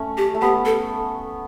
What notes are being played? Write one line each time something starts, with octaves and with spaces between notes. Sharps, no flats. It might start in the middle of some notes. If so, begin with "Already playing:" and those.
Already playing: A3 C#4
G4
A3
B3 G4
A4